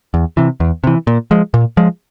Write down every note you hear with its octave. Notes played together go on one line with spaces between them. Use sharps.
E2
C3 E3
E2
C3 E3
A#2
F3 G#3
A#2
F3 G#3